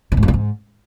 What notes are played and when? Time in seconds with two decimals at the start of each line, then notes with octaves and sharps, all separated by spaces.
0.12 C3
0.17 G#2
0.23 F2
0.28 A#2
0.34 G#2